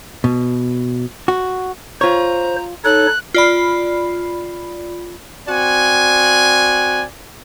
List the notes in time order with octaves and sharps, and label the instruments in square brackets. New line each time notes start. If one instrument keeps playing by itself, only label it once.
[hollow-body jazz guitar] B2
F#4
[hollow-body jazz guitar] F4 C#5 [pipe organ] C5 [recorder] A#5
[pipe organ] D#4 C#5 [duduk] A4 [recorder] F#6
[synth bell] F4 D5 B5
[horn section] C4 F#4 D5 G#5